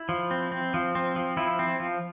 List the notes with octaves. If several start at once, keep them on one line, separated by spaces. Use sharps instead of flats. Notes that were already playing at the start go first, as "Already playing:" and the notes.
Already playing: E4
F3
C4
C4
F3
C4
F3
F3 E4
C4
F3